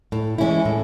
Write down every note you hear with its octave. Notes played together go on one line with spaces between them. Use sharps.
A2
E3 G#3 C#4 E4
A2